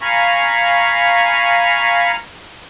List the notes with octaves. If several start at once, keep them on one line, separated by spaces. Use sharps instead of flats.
F5 G#5 A#5 B5 C#6